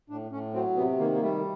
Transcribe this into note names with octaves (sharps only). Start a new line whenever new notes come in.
A2 D4
A2 C#4
F#3 C4
C3 B3
D#3 A#3
A#3
G3 A3